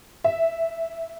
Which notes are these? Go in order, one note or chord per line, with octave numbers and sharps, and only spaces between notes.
E5